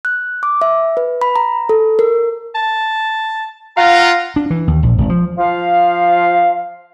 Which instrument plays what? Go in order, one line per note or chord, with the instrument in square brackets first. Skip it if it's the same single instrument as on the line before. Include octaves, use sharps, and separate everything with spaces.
[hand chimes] F#6
D6
E5
B4
B5
A#5
A4
A#4
[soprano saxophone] A5
[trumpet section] F4 F#5 A#5 [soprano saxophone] F5
[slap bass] D4
E3
D#2
A#1
G#1
F3
[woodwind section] F3 F5